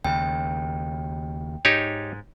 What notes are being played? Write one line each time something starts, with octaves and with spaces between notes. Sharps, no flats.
D#2 C#3 G5
G#2 D#4 G4 C#5